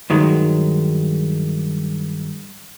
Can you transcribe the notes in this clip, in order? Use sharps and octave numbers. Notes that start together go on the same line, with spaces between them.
G2 D#3 F#3 G#3